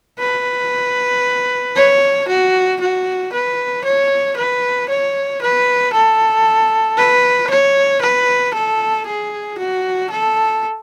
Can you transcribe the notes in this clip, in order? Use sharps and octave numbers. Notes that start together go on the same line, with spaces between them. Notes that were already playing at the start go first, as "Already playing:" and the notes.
B4
C#5
F#4
F#4
B4
C#5
B4
C#5
B4
A4
B4
C#5
B4
A4
G#4
F#4
A4